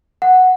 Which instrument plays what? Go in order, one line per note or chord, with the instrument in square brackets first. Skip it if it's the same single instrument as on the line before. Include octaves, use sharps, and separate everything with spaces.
[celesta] F#5